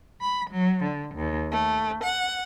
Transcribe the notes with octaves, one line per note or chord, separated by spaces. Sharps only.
B5
F#3
D3
D#2
A3
F#5